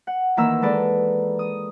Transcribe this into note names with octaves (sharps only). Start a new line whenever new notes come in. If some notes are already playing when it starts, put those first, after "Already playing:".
F#5
D#3 E3 A#3 E5 E6
G#3 A4 B4 D5
D#6